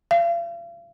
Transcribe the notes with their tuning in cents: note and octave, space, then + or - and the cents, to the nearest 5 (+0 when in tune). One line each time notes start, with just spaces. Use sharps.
F5 -40